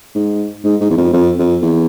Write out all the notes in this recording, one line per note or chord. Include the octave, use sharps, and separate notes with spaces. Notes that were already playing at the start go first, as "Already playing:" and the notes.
G#2
G#2
G#2
E2
F2
F2
F2
E2